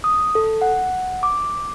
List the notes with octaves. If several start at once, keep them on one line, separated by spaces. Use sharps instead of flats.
D#6
A4
F#5
D6